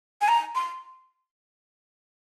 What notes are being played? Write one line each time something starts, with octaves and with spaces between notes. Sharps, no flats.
G#5
A#5
C6